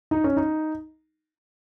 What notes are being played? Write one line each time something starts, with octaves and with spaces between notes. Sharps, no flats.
D#4
C#4
D#4